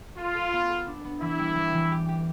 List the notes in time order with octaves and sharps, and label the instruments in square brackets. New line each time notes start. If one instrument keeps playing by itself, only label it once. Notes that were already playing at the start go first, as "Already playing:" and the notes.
[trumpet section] F4 [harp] A4
[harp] A4
B3
A4
D4
B3
[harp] E3 [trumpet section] E4
[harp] G3
G3
E3
G4
G4